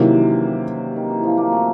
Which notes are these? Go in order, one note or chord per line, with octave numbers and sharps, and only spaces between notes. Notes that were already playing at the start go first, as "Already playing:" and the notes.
Already playing: C3 D#3 E3 F#3 A#3 C#4
D#3
E3
F3
A#3
A3